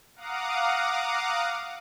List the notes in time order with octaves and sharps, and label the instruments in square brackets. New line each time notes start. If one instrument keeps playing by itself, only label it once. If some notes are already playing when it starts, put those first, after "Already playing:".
[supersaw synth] F5 F#5 A#5 D6 D#6